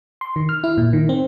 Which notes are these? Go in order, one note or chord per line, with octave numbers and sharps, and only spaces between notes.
C6
D#3
F6
E4
A#2
D#3
C4